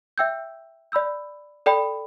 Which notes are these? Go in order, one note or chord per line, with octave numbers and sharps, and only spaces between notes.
E5 G5 E6 G6
D5 B5 E6 G6
A4 D5 G5 B5